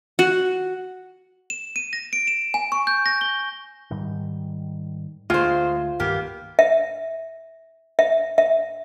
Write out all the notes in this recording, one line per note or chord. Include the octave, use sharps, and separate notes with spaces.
F#4
E7
D#7
A#6
D7
E7
G#5
C#6
G6
A#6
G7
G#2 D#3 G3
D2 G#3 F4 C5
C2 G2 D#3 A#3 B3 G4
E5
E5
E5